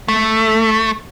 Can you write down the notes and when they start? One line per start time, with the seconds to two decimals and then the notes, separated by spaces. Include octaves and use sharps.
0.08 A3